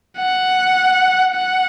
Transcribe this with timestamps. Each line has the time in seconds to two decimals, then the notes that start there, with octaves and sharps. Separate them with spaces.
0.18 F#5
1.35 F#5